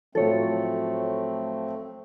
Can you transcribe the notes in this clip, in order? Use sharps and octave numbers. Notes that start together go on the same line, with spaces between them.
A2 F3 F#3 A3 C4 A4 C#5